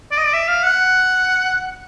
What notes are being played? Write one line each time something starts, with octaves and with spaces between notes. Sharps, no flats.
D5
D#5
D5
E5
F5
F#5